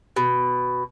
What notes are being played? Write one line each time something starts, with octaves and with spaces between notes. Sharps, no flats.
B2